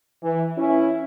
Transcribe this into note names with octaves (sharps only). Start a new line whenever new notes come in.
E3
C#4 E4